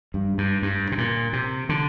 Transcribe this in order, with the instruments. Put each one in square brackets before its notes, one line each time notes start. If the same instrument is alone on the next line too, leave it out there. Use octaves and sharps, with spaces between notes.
[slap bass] G2
G2
G2
C3
A#2
C3
D3